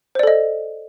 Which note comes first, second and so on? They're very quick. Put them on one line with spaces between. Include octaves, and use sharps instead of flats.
C5 D5 A4 D#5